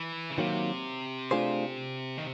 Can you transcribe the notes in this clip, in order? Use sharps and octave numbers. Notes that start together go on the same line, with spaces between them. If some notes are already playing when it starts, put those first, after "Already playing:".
Already playing: E3
C#3
C3 D#3 F#3 A#3
A3 D4 F4 G#4 C5
D#3